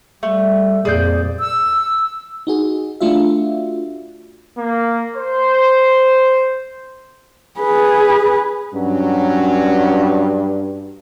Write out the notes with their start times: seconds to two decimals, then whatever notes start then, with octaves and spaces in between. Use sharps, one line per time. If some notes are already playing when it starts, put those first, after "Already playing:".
0.23 G3 A3
0.85 F2 A#2 G#4 D5 G6
1.40 E6
2.47 D#4 F#4 G#4
3.01 A3 D4 F4 F#4 E5
4.57 A#3
5.16 C5
7.60 G#4 B4
8.74 G2 F#3 C#4